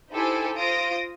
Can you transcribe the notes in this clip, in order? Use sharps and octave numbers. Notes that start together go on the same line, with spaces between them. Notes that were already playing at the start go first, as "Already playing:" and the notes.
D#4 E4 G4 A4 C5 G#5
F4 C5 D#6 A#6 D7